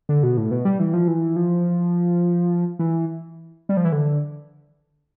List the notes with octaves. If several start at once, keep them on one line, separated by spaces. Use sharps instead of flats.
D3
B2
A2
B2
G3
E3
F3
E3
F3
E3
G3
F3
E3
D3